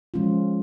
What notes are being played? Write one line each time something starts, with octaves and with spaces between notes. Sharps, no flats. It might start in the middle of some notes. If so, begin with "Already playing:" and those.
F3 G#3 C#4 F4